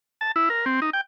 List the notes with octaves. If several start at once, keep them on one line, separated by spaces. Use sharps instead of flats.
A5
E4
A#4
C4
D#4
G5